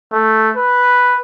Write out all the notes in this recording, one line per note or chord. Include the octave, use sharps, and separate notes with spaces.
A3
B4